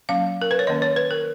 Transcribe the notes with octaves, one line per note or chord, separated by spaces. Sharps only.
F#3 A#3 C#4 F5
A#4
B4
C#5
D#3 A#3 C#4 D#5
C#5
B4
A#4